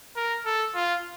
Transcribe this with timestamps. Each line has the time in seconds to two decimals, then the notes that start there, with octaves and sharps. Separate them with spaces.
0.16 A#4
0.45 A4
0.75 F4